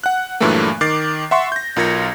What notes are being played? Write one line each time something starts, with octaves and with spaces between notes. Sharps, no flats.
F#5 F#6
G2 A#2 E3 F#3 A3 A#3
D#3 D6 A6 C7
E5 F#5 C6 C#6
G6 A#6
B1 F4 A#4 G#6 A#6 C#7